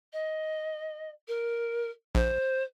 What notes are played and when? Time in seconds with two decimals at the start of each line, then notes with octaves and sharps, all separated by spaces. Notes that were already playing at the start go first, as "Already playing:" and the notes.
0.13 D#5
1.28 A#4
2.15 A#1 C5